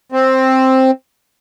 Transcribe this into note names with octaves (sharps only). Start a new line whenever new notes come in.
C4